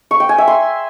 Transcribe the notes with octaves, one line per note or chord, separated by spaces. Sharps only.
C#6
G5
G#5
E5
C6